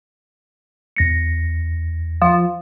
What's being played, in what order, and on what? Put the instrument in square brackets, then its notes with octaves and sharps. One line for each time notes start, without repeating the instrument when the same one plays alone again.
[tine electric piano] E2 A#6 C#7
[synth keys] F3